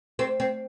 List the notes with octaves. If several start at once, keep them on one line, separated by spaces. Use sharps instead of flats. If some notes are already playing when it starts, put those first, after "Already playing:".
C4
C4